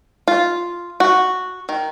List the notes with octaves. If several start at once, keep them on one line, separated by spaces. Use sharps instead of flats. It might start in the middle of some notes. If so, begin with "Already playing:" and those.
F4
F#4
D#3